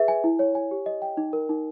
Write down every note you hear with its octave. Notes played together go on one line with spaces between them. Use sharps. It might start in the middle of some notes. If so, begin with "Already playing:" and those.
Already playing: G#4 B4 E5
G#5
E4
C#5
G#5
G4
D#5
G5
D#4
A#4
D#4